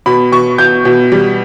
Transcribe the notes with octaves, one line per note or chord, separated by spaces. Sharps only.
B2 B5
B2 C#6
B2 G6
B2
G3